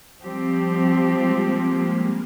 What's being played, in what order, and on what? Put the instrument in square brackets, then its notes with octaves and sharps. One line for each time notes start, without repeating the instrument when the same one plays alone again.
[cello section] F3 C4 G4 [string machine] G3
[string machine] G#3
A#3
G#3